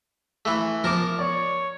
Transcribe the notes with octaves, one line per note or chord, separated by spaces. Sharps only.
E3 A3
F3 A#4 A5 D6
C#5 D5